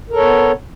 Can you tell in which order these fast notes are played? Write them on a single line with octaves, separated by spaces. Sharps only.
A#4 A4 C#5 B3